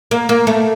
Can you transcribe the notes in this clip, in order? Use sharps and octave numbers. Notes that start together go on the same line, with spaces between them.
A#3
A#3
A3